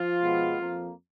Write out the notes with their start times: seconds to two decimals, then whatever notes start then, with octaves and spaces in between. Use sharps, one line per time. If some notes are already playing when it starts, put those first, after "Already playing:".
Already playing: F3 F4
0.22 B2 G#3 B3
0.58 F2 F3 A#3